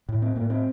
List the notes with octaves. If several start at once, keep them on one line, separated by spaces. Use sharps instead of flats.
A2
C4
A2 A#3
C4